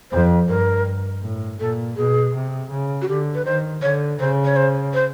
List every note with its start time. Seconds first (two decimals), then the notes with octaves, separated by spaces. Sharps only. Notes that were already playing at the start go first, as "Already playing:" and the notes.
0.11 F2 C5
0.48 G2 A#4
1.22 A2
1.60 A#2 A4
1.97 B2 G#4
2.34 C3
2.71 C#3
3.02 F#4
3.08 D3 G4
3.35 B4
3.45 D#3 C5
3.82 D3 C#5
4.19 C#3 C5
4.45 C#5
4.56 C5
4.94 C5